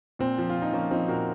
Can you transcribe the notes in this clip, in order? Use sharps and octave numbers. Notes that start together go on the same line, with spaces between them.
A#2 C4
F3
F4
A#2
D#4
F3 A#3 C#4
F3 C4 D#4
A#2 F#4 A#4